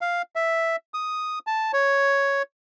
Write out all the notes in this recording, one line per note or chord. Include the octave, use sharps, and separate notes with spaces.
F5
E5
D#6
A5
C#5